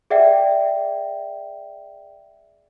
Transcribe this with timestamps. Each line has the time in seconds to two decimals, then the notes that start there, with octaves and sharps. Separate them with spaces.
0.10 G#4 D5 E5 F#5 G5